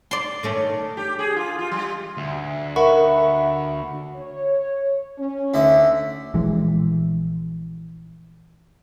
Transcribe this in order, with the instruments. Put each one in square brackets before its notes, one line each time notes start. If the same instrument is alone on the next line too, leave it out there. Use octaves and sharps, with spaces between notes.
[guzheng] D5 C6
[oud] D#3 A3 C#4
[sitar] G4
G#4
F4
F4
G3
[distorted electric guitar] D2
[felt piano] A#4 [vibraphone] E5 [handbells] F#5 B5 C#6
[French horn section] C#5
C#4
[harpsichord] D2 D3 E5
[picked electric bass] A#1 E3 G#3